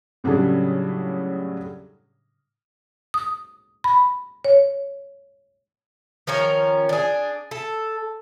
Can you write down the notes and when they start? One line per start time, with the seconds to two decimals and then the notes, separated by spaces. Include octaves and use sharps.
0.24 A2 C#3 F#3 G3 D4 G#4
3.14 D#6
3.84 B5
4.44 C#5
6.27 D#3 F3 C#4 A#4
6.89 D4 G#4
7.51 A4